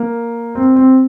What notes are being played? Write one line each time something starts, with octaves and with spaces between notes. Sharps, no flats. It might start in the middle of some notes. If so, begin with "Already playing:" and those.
Already playing: A#3
C4
C4